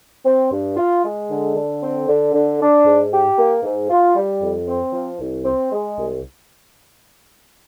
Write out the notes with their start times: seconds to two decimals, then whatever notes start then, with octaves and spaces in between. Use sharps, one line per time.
0.25 C4
0.51 G2
0.77 F4
1.03 G#3
1.29 D3
1.55 D3
1.81 C4
2.07 D3
2.33 D3
2.59 D4
2.85 G#2
3.11 G4
3.37 A#3
3.63 G#2
3.89 F4
4.15 G3
4.41 F2
4.67 C4
4.93 F3
5.20 C2
5.45 C4
5.72 G#3
5.98 C2